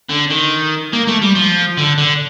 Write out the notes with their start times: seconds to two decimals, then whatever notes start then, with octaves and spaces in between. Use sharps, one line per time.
0.09 D3
0.30 D#3
0.93 A#3
1.08 A3
1.22 G3
1.35 F3
1.78 D3
1.98 D3